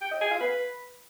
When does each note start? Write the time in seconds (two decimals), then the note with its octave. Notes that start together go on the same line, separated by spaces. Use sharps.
0.01 G5
0.11 D#5
0.21 G#5
0.31 F5
0.41 B4